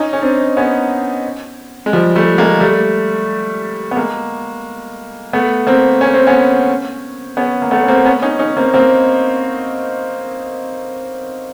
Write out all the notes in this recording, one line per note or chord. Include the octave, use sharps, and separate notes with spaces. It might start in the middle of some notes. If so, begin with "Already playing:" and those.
Already playing: C#4 D#4
C#4
C4 D4
B3 C#4
G#3
F3 G3
G3 A3
G#3 A#3
G3 A3
B3
G#3 A#3
A3 B3
A#3 C4
C#4
C4
B3 C#4
B3 C#4
A#3
A3 B3
C#4
A#3 C4
B3 C#4
C#4 D#4
C#4 D#4
A#3 C4
A#3 C4